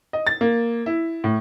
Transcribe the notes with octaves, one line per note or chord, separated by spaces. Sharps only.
D#5
A6
A#3
E4
A2